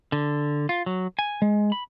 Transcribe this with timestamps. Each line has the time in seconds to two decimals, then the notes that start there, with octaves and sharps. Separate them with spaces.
0.12 D3
0.69 F4
0.86 F#3
1.19 G#5
1.42 G#3
1.72 B5